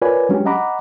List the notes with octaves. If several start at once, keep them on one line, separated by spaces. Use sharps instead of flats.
F4 A#4 B4 C#5 D5 G#5
F#3 G#3 C#4 D4 G4
D#5 F#5 A#5 B5 D6